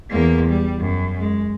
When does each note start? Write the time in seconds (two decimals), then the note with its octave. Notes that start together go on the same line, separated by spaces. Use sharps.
0.11 E2 A#3
0.49 G3
0.79 F#2
1.19 G#3